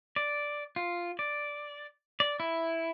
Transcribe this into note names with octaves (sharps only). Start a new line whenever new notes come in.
D5
F4
D5
D5
E4